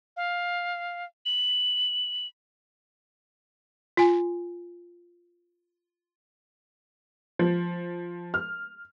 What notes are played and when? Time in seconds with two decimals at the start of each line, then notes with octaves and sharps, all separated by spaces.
0.17 F5
1.26 F#7
3.97 F4 G#5
7.39 F3
8.34 F6